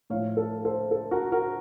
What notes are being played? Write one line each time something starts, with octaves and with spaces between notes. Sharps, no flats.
A2 F3 C#5 F5
A4
A4 C5
A4
F#4 A#4
F#4 A#4